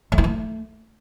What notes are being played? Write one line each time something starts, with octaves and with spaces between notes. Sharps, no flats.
A3
E4
A3